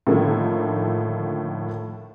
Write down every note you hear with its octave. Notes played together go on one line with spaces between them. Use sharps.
A2 D3 D#3 F3 A3 A#3